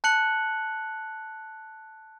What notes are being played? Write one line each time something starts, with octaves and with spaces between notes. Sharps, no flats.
A5 F#6 C#7 F#7